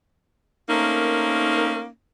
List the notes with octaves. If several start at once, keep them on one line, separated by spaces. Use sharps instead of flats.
A3 A#3 C4 C#4 D#4 A#4